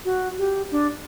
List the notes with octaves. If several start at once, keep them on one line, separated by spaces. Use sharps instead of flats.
F#4
G4
D4